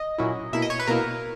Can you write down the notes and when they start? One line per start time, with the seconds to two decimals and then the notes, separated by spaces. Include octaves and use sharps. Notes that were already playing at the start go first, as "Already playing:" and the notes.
Already playing: D#5
0.18 A#2 F#3 C#4 E4
0.53 B2 A#3 E4 E5
0.62 D#5
0.70 C#5
0.80 B4
0.87 B2 A#3 E4 A#4